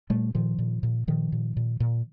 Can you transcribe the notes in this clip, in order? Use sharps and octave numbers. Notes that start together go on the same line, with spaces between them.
A#2 G3 A3
A#2 D#3 F3
A#2
A#2
A#2 D#3 F3
A#2
A#2
A#2